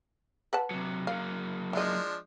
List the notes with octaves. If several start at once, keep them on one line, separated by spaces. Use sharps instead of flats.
B4 F#5 A5
C3 F#3
F#3 A#3 F5
F3 G#3 D4 E4 D#5